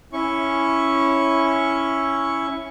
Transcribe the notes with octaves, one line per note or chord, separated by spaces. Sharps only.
C#4 E4 C#6